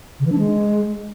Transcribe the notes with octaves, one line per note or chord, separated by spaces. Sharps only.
C#3
E3
D4
G#3